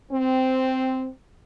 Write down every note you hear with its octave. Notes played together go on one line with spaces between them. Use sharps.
C4